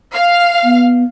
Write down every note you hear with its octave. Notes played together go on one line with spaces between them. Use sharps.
F5
B3